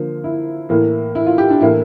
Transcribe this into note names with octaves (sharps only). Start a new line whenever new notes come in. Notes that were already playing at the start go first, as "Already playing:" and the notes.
Already playing: D3 F3 A#3
E4
A2 E3 A#3
E4
F4
G4
D4
A2 E3 A#3 E4